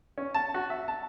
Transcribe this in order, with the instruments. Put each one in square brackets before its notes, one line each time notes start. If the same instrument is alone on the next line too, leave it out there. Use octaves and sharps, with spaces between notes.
[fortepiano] C#4
A5
F#4
E5
A5